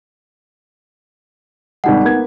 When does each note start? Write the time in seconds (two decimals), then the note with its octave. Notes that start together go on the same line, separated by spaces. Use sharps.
1.84 G#1 G3 G#3 D#4 F#5
2.05 A#3 B3 G#6